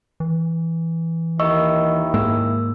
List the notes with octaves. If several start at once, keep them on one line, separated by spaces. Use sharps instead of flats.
E3
D#2 D#3 E4 D#5 C#6 E6
G#2 G#3 A#3 E6